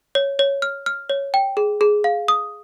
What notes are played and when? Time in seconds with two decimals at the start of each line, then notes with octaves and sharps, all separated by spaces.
0.15 C#5
0.39 C#5
0.62 F6
0.86 F6
1.10 C#5
1.34 G5
1.57 G#4
1.81 G#4
2.04 F5
2.28 D#6